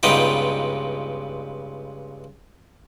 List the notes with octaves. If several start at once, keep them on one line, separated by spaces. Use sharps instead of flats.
C#2 G2 B3 D#4 F4 G4